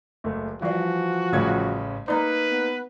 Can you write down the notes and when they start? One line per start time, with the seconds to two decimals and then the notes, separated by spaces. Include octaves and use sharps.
0.24 F#1 C#2 A3
0.62 E3 F3 G3 F#4 D5
1.32 A1 C#3 G3 A3 G#6
2.08 A#3 D#4 B4 D5 A#5
2.50 B3